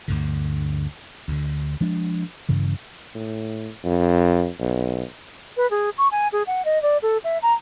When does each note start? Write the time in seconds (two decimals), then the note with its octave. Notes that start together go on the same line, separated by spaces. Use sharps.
0.08 D2 G2 D3
1.28 D2 D3
1.81 F3 G#3 D4
2.49 G2 C#3 E3
3.15 A2
3.84 F2
4.60 B1
5.57 B4
5.71 G#4
5.98 C#6
6.12 G#5
6.33 G#4
6.47 F#5
6.65 D#5
6.83 D5
7.02 A4
7.24 E5
7.42 A#5